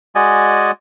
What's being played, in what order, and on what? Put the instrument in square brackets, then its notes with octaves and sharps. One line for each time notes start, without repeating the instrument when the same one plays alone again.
[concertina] G#3 F#4 D5 D#5 G#5